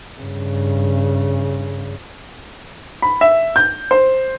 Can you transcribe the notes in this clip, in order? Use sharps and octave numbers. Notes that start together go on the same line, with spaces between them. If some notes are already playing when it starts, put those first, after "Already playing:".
G2 C#3
B5
E5
G6
C5